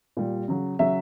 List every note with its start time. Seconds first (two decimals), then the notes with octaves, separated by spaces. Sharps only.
0.17 A#2 G3
0.48 C#3 F#3
0.79 C#3 F#3 E5